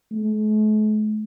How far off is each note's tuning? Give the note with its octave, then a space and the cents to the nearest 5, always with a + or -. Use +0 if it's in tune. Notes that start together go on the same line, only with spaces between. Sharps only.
A3 -45